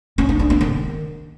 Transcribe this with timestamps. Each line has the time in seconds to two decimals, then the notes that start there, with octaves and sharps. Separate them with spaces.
0.18 C#4
0.29 D#4
0.39 D4
0.50 B3
0.61 D#3